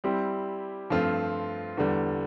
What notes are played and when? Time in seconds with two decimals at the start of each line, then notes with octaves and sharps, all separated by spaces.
0.04 G3 C4 E4 G4
0.90 G2 F3 A3 C4 F4
1.77 E2 D3 G3